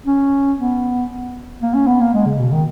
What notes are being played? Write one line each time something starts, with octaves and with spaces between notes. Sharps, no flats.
C#4
B3
A#3
C#4
B3
A#3
G#3
C#3
B2
D#3